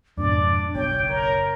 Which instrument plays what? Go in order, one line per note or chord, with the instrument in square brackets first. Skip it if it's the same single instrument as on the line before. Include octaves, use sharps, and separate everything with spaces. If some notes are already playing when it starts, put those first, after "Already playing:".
[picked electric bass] F2 G#2 B2 [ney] D4 [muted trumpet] D5
[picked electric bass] F#1 B1 B2 [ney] C#5 [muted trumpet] G5
[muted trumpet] A#4